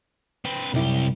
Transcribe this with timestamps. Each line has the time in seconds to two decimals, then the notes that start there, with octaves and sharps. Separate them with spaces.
0.45 C4 B4
0.74 C2 F#2 E4 G4